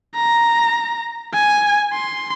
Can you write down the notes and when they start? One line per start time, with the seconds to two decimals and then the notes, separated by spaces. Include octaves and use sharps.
0.15 A#5
1.34 G#5
1.93 C6